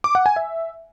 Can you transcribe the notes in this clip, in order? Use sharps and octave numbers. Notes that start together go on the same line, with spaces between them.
D6
F#5
G#5
E5